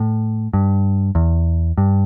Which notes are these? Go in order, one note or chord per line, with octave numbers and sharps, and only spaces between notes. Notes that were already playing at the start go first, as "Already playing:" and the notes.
Already playing: A2
G2
E2
G2